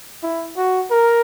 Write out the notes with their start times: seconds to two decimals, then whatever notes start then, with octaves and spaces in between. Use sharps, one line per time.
0.23 E4
0.57 F#4
0.90 A#4